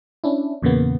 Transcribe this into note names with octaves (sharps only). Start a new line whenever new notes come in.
C#4 D4 E4
E2 A#2 C#3 A#3 B3